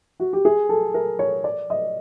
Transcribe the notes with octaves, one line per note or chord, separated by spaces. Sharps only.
F#4
G4
G#4
A4
A#4
C#5
D5
D#5